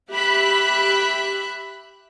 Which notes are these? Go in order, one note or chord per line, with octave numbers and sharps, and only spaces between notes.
G4 E5 B5 F#6